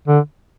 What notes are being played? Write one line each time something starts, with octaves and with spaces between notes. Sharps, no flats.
D3